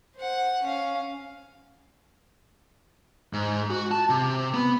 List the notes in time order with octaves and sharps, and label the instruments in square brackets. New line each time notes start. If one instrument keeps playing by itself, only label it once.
[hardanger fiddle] C5 F#5
C#4 F5
[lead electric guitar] G#2
F#4
A5
C3
B3